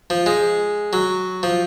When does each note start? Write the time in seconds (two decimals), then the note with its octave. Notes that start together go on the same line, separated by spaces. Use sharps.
0.10 F3
0.26 G#3
0.93 F#3
1.43 F3